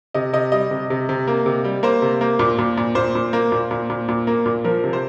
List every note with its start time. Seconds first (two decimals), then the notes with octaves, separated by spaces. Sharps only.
0.14 C3 D#5
0.33 C3 D#5
0.52 G3 D#5
0.71 C3
0.90 C3
1.09 C3
1.27 A#3
1.46 C3
1.64 G3
1.83 A#3 C5
2.02 C3
2.21 A#3
2.39 A#2
2.59 A#2
2.77 A#2
2.95 A#2 C5
3.15 A#2
3.33 A#3
3.52 A#2
3.71 A#2
3.90 A#2
4.09 A#2
4.27 A#3
4.46 A#2
4.64 F3 A#4
4.84 C3
4.93 C5